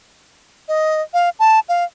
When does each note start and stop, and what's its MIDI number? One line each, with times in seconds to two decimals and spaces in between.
0.68 1.01 75
1.14 1.29 77
1.39 1.59 81
1.69 1.84 77